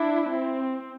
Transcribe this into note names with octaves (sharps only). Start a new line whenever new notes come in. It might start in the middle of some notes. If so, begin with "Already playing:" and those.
Already playing: D4 E4
C4